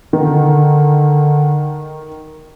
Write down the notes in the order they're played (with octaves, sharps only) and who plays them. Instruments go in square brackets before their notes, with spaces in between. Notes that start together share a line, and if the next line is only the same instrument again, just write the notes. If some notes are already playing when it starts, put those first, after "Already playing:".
[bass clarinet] D3 [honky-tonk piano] D#3